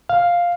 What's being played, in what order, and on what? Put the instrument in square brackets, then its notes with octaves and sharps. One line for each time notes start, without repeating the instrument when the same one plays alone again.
[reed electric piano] F5